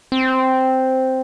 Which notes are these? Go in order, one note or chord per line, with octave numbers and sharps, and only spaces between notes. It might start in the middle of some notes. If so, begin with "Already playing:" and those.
C4